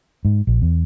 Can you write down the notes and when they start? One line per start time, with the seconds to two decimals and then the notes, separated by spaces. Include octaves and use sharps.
0.25 G#2
0.47 A#1
0.62 E2